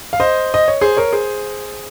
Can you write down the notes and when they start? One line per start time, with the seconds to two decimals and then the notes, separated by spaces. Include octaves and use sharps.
0.13 F5
0.20 C5 D#5
0.54 D#5
0.68 C#5
0.81 G#4 C5
0.97 A#4 C#5
1.13 G#4 C5